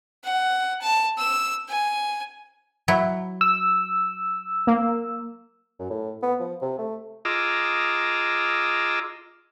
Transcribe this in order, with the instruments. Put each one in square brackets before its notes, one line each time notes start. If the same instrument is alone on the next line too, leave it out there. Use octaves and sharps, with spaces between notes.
[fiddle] F#5
A5
E6
G#5
[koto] F#3 E4
[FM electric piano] E6
[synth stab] A#3
[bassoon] F#2
A2
B3
F3
C3
A3
[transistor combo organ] F4 G#4 D#5 A#5 D6 E6